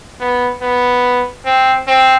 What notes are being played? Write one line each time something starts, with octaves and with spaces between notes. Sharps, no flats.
B3
B3
C4
C4